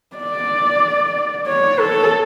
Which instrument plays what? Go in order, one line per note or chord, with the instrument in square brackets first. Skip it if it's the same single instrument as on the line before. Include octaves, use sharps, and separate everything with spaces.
[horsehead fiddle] D5
C#5
A4